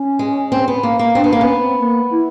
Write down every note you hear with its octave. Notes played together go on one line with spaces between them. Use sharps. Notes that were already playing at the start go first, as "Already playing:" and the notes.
Already playing: C#4
G#3
C4
B3
A#3
A#3
C4 D4
B3
A#3
B3 C#4
C4
A#3
E4